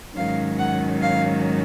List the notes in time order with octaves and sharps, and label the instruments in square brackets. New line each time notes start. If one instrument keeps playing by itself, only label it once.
[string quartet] G#2 D#3 F#3 C#4 F5
F#5
F5